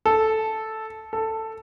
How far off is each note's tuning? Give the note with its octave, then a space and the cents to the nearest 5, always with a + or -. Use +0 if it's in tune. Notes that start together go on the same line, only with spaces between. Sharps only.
A4 -5
A4 +10